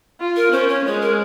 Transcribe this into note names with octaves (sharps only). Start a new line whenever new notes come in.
F4
A#4
C#4 C5
C#5
G#3 C#5
A#4